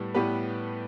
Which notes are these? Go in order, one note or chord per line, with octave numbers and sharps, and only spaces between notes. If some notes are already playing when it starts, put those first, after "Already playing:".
Already playing: A2 G3 B3
A2 G3 B3 G4 B4